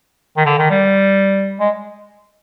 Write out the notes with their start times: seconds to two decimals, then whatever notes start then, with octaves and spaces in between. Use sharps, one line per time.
0.37 D#3
0.46 D3
0.59 D#3
0.71 G3
1.60 G#3